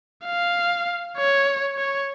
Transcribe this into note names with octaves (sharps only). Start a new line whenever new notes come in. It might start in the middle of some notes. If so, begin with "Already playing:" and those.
F5
C#5
C#5